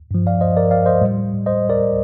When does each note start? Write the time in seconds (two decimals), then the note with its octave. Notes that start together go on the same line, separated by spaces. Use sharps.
0.11 G2 F3
0.27 D5 F5
0.41 C5 D#5
0.57 A#4 D5
0.71 D5 F5
0.86 C5 D#5
1.01 A2 G3
1.46 C5 D#5
1.70 A#4 D5